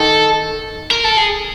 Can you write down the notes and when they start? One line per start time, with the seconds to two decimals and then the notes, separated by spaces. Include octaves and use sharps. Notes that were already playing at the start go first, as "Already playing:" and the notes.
Already playing: D#3 D#4 A4
0.91 A#4
1.04 A4
1.18 G#4